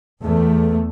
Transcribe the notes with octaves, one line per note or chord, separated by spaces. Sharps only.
E2 A3